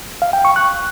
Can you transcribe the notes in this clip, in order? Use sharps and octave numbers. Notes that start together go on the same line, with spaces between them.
F5
G5
C#6
F#6